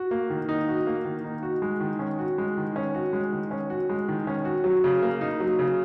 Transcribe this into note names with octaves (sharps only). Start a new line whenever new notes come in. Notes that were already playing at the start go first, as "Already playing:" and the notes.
Already playing: F#4
A#3
D#3
D#4
F#4
A#3
D#3
D#4
F#4
G#3
D#3
C#4
F#4
G#3
D#3
C#4
F#4
G#3
D#3
C#4
F#4
G#3
D#3
C#4
F#4
F#3
C#3
A#3
D#4
F#3
C#3